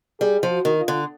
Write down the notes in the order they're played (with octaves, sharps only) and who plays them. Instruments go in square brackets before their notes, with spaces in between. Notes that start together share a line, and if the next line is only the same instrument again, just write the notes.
[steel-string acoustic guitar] G3 [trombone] G#4
[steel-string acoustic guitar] F3
[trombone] F#4
[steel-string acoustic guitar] D#3
[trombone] F4
[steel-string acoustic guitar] D3